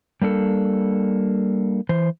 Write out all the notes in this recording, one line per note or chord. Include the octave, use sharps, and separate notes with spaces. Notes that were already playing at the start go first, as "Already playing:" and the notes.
G3 A#3 D4 A4
E3 C5